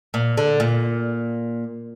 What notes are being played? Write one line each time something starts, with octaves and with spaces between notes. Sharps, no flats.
A#2
D3
A#2